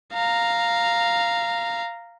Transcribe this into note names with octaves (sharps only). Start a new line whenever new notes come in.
F5 A#5